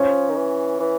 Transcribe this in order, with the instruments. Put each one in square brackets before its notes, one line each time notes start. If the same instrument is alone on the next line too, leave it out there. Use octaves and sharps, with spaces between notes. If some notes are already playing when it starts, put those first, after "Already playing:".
Already playing: [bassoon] F3 [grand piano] C#4
[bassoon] D#3
E3
E3